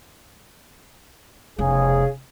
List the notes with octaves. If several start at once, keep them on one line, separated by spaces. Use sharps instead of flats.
F1 C#3 B3 G#4